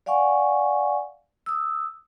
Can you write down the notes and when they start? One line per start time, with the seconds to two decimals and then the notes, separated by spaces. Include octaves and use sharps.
0.06 D5 F5 F#5 G#5 C#6
1.46 D#6 E6